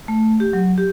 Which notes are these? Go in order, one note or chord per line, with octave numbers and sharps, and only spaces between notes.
A3
G4
F#3
G4